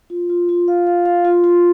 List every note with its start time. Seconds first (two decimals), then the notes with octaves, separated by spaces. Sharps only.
0.10 F4
0.29 F4
0.49 F4
0.68 F5
0.87 F5
1.05 F5
1.25 F4
1.44 F4